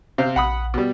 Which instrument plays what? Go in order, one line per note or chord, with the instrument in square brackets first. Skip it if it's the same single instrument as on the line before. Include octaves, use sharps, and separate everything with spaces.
[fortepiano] C3 C5 F5
[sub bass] A#1 [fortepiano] F#5 B5 D#6
[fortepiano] B2 G3